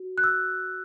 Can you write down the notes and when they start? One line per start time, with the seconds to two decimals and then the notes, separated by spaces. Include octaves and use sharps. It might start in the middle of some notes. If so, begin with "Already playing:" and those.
Already playing: F#4
0.18 F#6
0.24 E6